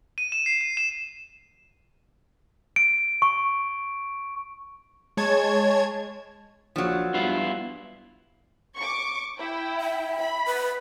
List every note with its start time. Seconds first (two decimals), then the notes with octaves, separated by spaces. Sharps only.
0.18 D#7
0.32 E7
0.46 C7
0.61 D#7
0.77 E7
2.76 D7
3.22 C#6
5.17 G#3 C#5 A5 G#6
6.76 A#1 F3 F#3
7.14 G2 B3 E4 F4
8.76 C#6 D6
9.39 E4 G5
9.81 E5
10.17 B5
10.46 B4